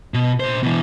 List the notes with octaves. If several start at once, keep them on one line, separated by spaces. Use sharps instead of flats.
B2
A#2 C5
B2 E3